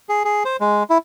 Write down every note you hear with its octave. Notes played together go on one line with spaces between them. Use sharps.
G#4
G#4
C5
G#3
E4